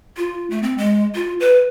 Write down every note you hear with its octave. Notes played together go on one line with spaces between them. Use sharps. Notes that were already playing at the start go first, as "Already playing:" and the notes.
F4
A3
C4
G#3
F4
B4